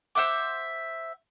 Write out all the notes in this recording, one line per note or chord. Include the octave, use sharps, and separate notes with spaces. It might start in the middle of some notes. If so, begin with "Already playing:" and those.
C5 E5 F#5 D6